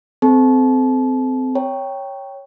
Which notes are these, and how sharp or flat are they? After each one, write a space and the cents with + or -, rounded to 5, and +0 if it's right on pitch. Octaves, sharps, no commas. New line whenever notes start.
C4 -20 A4 -30 A5 -30
C#5 +0 G5 +0 A#5 +5